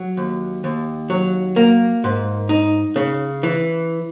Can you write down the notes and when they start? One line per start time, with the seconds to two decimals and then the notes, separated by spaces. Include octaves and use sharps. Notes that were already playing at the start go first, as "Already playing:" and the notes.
Already playing: F#3
0.17 D#2
0.64 D#2
1.10 F#3
1.56 A#3
2.04 G#2
2.49 D#4
2.96 C#3
3.43 E3